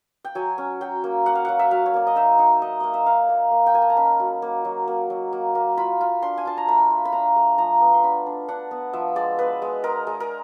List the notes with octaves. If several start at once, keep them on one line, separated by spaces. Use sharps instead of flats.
G5
F#3 G#5
C#4
F#3 G5
A#3
A#3 F#5
F5
F#3 F#5
E5
F#3 F5
C#5
A#3 D5
D#5
D#4 E5
D#4
D#4 D#5
A#3 D#5
E5
D#4 F5
A#3
A#3
G5
A#3 G#5
A5
A#5
C#4 B5
F#3
A#3
F#3
A#3
F#3
A#3
A#3
F4 B5
F4
D4 C6
G#5
F4 A5
A#5
A3 B5
F4
B5
D4 A#5
A3
F3 A#5
B3
C6
D4 B5
D4
D4 F#5
B3
F3 E5
G#3 D5
B3 B4
G#3
G#3 A#4
G#3
A#4